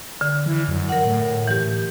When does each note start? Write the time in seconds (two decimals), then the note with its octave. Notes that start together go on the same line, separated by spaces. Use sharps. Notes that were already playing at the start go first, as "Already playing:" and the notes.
0.21 D3
0.46 E3
0.68 F#2
0.89 A#4 F#5
1.06 A2
1.47 E3 G4